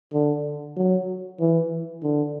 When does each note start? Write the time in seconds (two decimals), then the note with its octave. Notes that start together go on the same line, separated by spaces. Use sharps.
0.13 D3
0.76 F#3
1.40 E3
2.03 D3